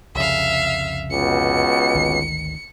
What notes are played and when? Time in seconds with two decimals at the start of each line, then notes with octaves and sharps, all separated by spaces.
0.15 C2 F2 C#3 E5 F5
1.10 C#2 B2 C#7
1.94 G#1 D2 D#3